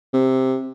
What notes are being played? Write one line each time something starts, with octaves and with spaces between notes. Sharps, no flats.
C3